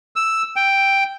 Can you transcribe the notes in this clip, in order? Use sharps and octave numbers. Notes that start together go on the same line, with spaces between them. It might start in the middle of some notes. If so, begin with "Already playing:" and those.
E6
G5